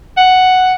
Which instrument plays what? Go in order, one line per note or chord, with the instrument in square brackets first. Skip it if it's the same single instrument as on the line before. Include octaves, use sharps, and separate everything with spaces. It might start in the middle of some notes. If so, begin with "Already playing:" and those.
[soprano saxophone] F#5